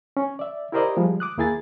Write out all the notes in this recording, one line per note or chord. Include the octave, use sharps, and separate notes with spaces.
C#4
D5 E5
E4 G4 A#4 C5 D5 D#5
F3 G3 G#3
D6 D#6 F#6
D#2 A#3 E4 G#4 G#5 A6